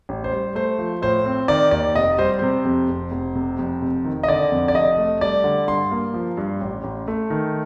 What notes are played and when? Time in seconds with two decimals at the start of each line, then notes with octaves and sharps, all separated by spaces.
0.09 A1
0.24 C5
0.32 G3
0.55 A3 C5
0.79 F3
1.02 A2 C5
1.25 C4
1.48 D#3 D5
1.71 D#2 D5
1.95 F1 D#5
2.18 G3 C5
2.39 C3 C5
2.65 F2
2.88 F1
3.11 F1
3.35 C3
3.59 F2
3.81 F1
4.05 D#3
4.23 D#5
4.28 D3 D5
4.52 F2
4.68 D5
4.74 F1 D#5
4.98 A3
5.21 G3 D5
5.44 D3
5.68 G2 C6
5.91 A#3
6.14 F3
6.37 G2
6.61 A1
6.84 A1
7.08 A3
7.30 D#3